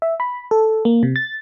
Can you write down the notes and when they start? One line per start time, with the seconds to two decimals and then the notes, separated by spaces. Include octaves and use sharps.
0.02 E5
0.20 B5
0.51 A4
0.85 A#3
1.03 C3
1.16 A6